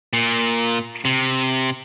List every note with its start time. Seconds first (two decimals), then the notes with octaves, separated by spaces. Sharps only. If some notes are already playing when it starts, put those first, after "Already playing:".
0.13 A#2
1.05 C3